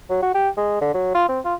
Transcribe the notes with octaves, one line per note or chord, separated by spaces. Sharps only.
F#3
F#4
G4
G#3
D3
F#3
F4
C4
F4